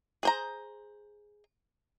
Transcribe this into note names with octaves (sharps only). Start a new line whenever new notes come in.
G#4 C5 A#5